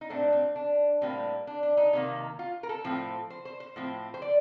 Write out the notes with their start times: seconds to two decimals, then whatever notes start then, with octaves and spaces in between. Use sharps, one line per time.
0.01 D#4
0.09 A#2 A3 C4 D4
0.33 C4
0.56 D4
1.01 A2 G3 A#3 C4
1.47 D4
1.63 D4
1.77 D#4
1.93 C3 D#3 A#3
2.39 F4
2.63 A#4
2.69 A4
2.84 A2 F3 C4
3.30 C5
3.45 C5
3.60 C5
3.76 A2 F3 C4
4.14 C5
4.22 D5